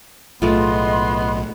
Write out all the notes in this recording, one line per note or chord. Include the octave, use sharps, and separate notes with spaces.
B1 A2 G#3 A3 B3 F4 D#5 C6